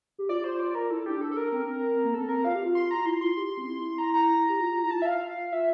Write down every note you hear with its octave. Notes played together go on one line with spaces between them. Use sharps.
G4
F4 D5
C5
D5
A#4
E4 A4
D4 G4
A4
A4
A#4
C4
A#3
C4 A4
A#4
F4 F5
G4
F4
C6
A#5
F4
E4 C6
F4 C6
G4
G4
C4
E4
A#5
A#5
G4
F4
E4 A#5
F4 A5
E5
F5
F4 E5